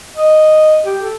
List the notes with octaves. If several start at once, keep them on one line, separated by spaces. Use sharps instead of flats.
D#5
G4
A4